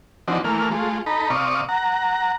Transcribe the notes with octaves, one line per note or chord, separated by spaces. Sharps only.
E3 F3 C4 D4 D#4 F#4
E3 A3 A#3 F6
G#3 A3 F4
D#4 A4 A#5 B5
C3 D5 F5 C#6 D#6
F#5 A#5